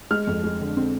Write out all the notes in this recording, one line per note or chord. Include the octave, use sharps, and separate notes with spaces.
G#3 F6
F2
G#3
D3
C4